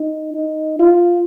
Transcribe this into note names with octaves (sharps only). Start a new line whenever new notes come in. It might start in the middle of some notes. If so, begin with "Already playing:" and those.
Already playing: D#4
D#4
F4